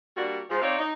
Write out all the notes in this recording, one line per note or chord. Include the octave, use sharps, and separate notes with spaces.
G3 A#3 D4 F#4
G#2 F3
C4 D#4 C#5 D5 F5
D#4